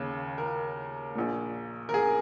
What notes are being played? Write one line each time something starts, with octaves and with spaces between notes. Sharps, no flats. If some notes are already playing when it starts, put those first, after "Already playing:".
Already playing: D#2 C#3
A#4
A#1 A#2
A#4
G#4